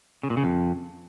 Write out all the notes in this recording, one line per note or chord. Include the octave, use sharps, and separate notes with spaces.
C#3
A#2
C#3
F2